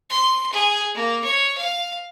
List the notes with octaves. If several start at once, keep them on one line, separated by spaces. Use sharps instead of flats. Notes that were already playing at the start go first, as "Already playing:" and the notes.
C6
G#4
A#3
C#5
F5